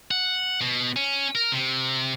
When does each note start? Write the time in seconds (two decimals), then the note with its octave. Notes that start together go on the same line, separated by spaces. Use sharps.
0.11 F#5
0.61 B2
0.96 C#4
1.35 A#4
1.52 C3